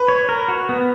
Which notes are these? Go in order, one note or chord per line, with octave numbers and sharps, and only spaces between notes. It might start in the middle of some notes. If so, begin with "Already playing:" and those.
Already playing: B4
C#5
A#4
F#4
B3